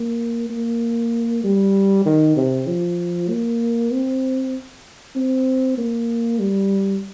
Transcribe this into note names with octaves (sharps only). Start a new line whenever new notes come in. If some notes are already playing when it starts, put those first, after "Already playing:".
Already playing: A#3
A#3
G3
D#3
C3
F3
A#3
C4
C4
A#3
G3